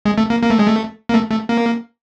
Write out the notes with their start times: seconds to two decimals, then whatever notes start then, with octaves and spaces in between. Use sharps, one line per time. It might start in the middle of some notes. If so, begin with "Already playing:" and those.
0.05 G#3
0.18 A3
0.30 A#3
0.43 A#3
0.50 A3
0.59 G#3
0.67 A3
1.09 A#3
1.14 A3
1.31 A3
1.49 A#3